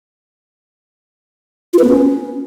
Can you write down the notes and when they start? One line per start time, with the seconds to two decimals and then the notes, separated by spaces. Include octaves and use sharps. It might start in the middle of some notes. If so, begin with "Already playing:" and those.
1.73 F4
1.79 B4
1.84 B3
1.89 C#4